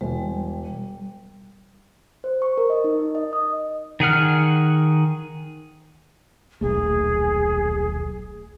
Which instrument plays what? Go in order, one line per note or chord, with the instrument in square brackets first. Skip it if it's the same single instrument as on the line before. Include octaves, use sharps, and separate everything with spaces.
[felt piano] E1 [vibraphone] G3
[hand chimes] C5
C#6
A#4
D#5
D#4
D#5
D#6
[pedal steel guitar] D#3 G#4 F#5 F6
[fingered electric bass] D#1 B1 A3 [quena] G#4